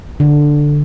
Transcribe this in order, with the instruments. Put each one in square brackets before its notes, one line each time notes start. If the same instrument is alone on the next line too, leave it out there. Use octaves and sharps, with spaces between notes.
[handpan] D3